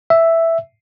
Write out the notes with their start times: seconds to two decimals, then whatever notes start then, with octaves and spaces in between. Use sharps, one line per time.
0.10 E5